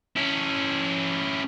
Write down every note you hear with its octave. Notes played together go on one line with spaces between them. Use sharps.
C#4 E4